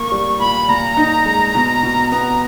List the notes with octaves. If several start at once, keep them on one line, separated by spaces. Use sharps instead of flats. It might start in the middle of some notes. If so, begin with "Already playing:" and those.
Already playing: A#3 C#6
G3
A#2 B5
A#2 A#5
D#4
G#3
B2
B2
B3 A#5